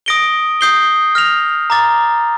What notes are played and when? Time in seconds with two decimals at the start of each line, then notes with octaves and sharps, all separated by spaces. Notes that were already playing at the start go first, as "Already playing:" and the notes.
0.06 D#6 A#6 D7 G7
0.61 D#6 G6 C7 G7
1.15 F6 A#6 F7
1.70 A#5 D6 A6